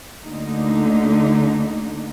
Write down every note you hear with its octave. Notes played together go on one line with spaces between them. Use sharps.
D2 D3 A3 A#3 D#4